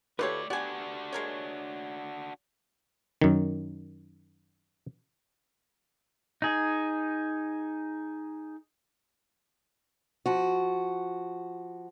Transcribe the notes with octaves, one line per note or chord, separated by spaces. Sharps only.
A3 D#4 F4 G4 A4 B4 C#5 D5
B3 D4 F#4 G4 D5 G#5
G#3 A#4 C#5
F#2 D#3
D#4 G#4
F3 F#4